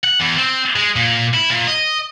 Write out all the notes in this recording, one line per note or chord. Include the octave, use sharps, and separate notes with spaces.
F#5
E2
C4
G#3
A#2
E4
A#2
D#5